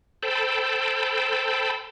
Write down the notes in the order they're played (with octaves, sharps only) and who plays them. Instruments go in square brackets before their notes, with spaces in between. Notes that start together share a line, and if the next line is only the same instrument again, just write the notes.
[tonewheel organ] A4 C5 G5 A5 B5